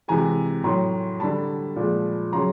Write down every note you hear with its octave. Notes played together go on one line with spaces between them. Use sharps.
C3 E3 G#3 G#5 A#5
A2 F#3 A#5 C6
D3 G3 A5 B5
A#2 F3 G#3
C#3 F#3 A#5 C6